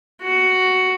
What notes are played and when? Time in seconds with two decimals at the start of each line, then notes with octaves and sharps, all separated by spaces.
0.22 F#4